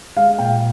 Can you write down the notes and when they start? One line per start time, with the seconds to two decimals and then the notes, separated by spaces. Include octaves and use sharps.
0.17 G#3 F5
0.38 A#2 G5